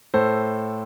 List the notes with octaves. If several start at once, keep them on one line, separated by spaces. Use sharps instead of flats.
A2 A4 C5